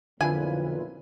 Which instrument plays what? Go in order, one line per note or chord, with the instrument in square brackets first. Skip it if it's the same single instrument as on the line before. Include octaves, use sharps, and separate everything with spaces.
[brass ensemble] B1 F2 A#2 [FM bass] D3 [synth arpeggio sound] E4 F4 B4 [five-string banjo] G#5